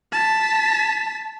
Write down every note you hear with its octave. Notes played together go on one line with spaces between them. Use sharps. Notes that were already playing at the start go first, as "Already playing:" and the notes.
A5 B6